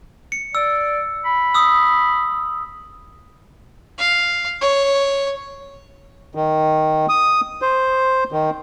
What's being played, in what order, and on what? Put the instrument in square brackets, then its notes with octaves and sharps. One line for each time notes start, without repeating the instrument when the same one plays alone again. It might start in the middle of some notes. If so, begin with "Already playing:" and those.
[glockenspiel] C#7
[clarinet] D5 [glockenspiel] E6
[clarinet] B5
[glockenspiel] D#6 E6
[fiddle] F5
C#5
[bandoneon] D#3
D#6
C5
D#3